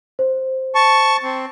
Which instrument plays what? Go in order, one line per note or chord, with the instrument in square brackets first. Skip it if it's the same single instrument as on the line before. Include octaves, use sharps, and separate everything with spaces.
[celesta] C5
[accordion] A5 C#6
C4